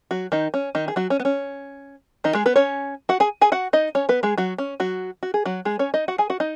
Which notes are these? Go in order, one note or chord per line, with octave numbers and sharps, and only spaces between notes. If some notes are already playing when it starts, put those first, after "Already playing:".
F#3 F#4
D#3 D#4
C#4
D#3 D#4
G#4
F#3 F#4
C#4
B3
C#4
D#3 D#4
G#3 G#4
B3 B4
C#4 C#5
F#4 F#5
G#4 G#5
G#4 G#5
F#4 F#5
D#4 D#5
C#4 C#5
B3 B4
G#3 G#4
F#3 F#4
C#4
F#3 F#4
F#4
G#4
F#3 F#4
G#3 G#4
C#4 C#5
D#4 D#5
F#4 F#5
G#4 G#5
F#4 F#5
D#4 D#5